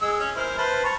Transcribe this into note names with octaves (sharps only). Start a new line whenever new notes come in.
G#3 E6
C#4
E4 A#4 C5
B4 C5 A5
A5 A#5 C#6